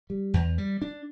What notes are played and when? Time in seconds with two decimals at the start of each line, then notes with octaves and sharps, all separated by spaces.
0.10 G3
0.34 E2
0.58 G3
0.82 D4